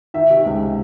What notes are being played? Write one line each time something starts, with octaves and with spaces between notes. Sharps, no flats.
D#3 E5
C3
C#2